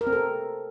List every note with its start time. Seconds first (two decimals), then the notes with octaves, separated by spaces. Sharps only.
0.01 A#4
0.07 C4
0.12 A4